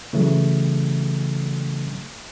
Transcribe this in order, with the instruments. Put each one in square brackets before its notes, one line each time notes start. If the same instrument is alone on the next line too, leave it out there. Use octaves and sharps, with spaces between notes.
[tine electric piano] C#3 E3 F#3 A3